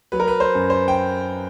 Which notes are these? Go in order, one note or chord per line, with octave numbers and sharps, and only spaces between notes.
F#3 B4
A#4
B4
C5
F#2
C5
G5